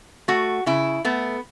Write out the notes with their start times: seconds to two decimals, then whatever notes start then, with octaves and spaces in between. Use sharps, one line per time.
0.28 A3 F#4
0.66 C#3 E4
1.05 A3 B3